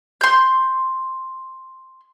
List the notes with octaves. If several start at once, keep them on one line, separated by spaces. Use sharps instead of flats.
C6 G6